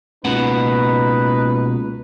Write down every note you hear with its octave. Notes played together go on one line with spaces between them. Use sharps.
C#2 B2 A#3 D#4 B4 F#5